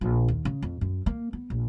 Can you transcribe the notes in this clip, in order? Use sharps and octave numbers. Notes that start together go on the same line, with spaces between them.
A#1
D#2
C#3
F2
F#2
A#3
B3
A#1